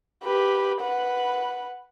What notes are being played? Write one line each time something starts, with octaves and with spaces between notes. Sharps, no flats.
G4 B4
B4 F#5